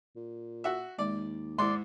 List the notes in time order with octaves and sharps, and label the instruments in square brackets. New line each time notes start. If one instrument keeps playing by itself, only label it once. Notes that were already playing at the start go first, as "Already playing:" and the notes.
[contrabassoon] A#2
[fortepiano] F#4 E5
[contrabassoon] D#2 [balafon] G#3 [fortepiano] D5
[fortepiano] G#2 [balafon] G#3 E4 [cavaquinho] D5 C6